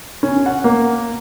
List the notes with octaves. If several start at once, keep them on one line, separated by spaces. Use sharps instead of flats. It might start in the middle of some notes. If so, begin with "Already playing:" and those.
C#4
F#5
A#3